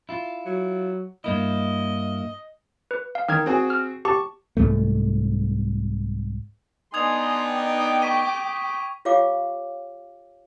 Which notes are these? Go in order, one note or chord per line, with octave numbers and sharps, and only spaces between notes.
E4 F4
F#3
G2 A#3 E4 D#5
B4
F5
D#3 A#4 F6 G#6
C4 F#4 G#4
F6
G4 A5 C#6
C2 F2 G#2 A3
B3 D4 D#4 G#5 C6 D#6 G#6 F7
G5 D6
C#6 B6 D#7
F4 G4 C#5 F5 D6